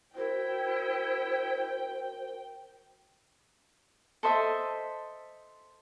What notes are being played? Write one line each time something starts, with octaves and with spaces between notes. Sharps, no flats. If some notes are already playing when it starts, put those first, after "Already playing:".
E4 F#4 A#4 C5 G5
A4 C5 D#5 E5